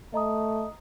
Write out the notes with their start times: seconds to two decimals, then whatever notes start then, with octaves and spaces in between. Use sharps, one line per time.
0.14 A3 D#5 A#5 D#6